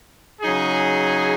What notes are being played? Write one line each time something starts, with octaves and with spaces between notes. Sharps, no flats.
C#3 F#3 D#4 G#4